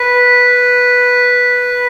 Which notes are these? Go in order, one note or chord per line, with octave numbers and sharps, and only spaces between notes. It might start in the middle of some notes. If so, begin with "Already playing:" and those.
Already playing: B4